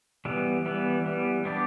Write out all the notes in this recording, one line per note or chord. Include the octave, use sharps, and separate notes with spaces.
E3 G3 B3
E3 G3 B3
E3 G3 B3
B3 D4 G4 D5